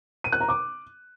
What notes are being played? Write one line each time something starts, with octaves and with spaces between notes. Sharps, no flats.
D#7
F#6
A#5
D6